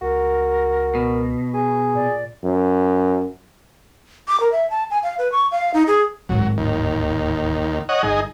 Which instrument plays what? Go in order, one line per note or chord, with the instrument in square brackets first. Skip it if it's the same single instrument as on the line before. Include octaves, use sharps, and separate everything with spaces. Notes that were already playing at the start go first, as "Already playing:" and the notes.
[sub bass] C#2 [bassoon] F#4 [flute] A#4
[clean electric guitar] B2
[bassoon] G#4
[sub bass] A#2 [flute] D5
[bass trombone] F#2
[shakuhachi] D6
A#4
E5
A5
G#5
F5
B4
C#6
F5
D#4
G#4
[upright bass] D1 G#1 [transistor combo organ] F#3
[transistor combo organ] D#2
C#5 D#5 F#5
[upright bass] G1 [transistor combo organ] D#4 G#4